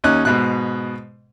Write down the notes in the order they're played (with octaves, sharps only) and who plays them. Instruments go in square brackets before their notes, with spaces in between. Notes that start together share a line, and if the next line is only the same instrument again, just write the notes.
[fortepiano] D#2 C#4 D#4 F#6
G#2 B2 F#6